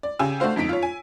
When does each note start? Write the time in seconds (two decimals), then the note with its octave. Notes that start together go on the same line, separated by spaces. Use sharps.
0.03 D5
0.19 C#3 G4 G5 G#5 E6
0.40 A3 D4 F#4 C5 F5
0.56 G1 F2 D#4 B6 D7
0.69 F4 C#5
0.83 G#5